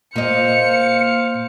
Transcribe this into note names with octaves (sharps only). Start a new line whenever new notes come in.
A#2 A#3 C5 D#5 F5 C#7